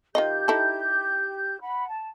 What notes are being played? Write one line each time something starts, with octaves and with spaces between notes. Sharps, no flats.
D#3 F4 G4 D#5 G6
D#4 E4 A4
F#5 B5
A5